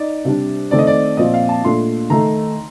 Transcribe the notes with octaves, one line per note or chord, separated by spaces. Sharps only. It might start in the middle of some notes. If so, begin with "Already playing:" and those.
Already playing: D#4 D5
C3 G3 D4
D#3 A3 C4 D5
D#5
D5
A#2 F3 C4 F4 D#5
F5
A5
A#2 A3 D4 F4 C6
D#3 A3 D#4 A#5